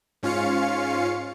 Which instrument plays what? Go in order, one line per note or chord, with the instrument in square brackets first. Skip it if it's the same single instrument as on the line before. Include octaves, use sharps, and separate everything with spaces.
[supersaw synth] G#2 C#4 F4 F5 C#7